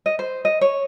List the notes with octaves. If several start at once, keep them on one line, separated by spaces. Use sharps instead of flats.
D#5
C5
D#5
C#5